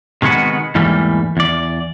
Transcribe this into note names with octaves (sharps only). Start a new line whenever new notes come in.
C3 D#3 G#3 B3 F#4
E2 G#2 E3 G3 A3 A#3
E2 D5